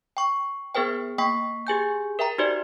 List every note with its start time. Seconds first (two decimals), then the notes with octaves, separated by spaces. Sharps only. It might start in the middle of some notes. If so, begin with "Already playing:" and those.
0.17 G5 C#6
0.75 B3 G#4 A#4 C5 G5
1.18 A#3 G5 C#6 B6
1.67 G4 G#4 G#5 G6
2.19 A#4 E5 G5 A#5
2.38 D#4 F#4 G4 C5 D5